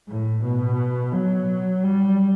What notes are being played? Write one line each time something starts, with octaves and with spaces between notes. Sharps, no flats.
A2
B2
F#3
G3